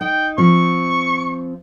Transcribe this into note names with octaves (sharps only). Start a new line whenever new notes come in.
D#4 G5
F3 C4 C#6